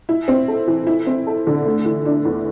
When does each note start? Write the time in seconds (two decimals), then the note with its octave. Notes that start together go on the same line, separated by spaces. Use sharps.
0.09 E4
0.28 C4
0.48 A4
0.68 E3
0.87 E4
1.07 C4
1.27 A4
1.47 D3
1.65 A3
1.85 E3
2.05 D4
2.25 E2